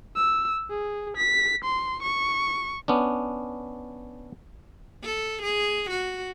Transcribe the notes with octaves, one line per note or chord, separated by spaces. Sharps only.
E6
G#4
B6
C6
C#6
B3 C#4 D4
A4
G#4
F#4